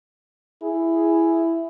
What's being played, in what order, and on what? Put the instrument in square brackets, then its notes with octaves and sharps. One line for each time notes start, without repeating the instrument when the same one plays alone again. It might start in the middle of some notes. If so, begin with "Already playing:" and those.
[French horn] E4 [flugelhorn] G#4